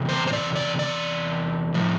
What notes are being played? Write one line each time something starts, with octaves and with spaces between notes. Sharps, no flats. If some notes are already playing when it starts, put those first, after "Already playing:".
Already playing: E2 C3
C5
C5
D5
D5
D5
A2 F3